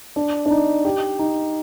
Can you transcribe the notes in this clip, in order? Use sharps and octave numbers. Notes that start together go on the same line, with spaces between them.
D4
D4
D#4
G4
D#4